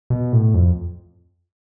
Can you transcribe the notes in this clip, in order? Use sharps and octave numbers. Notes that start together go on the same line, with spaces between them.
B2
A2
F2